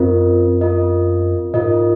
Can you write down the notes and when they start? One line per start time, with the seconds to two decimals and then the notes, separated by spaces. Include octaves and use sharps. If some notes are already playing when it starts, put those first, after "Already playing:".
Already playing: F#2 C4 F4 A#4 D#5
0.61 C4 F4 A#4 D#5
1.54 G#2 F4 A#4 D#5